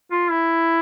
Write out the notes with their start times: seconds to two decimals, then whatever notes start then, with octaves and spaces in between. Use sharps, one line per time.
0.11 F4
0.31 E4